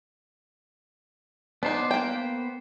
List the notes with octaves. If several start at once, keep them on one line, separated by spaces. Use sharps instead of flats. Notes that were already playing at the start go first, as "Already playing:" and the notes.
B3 D4 D#4 C5
A#3 G5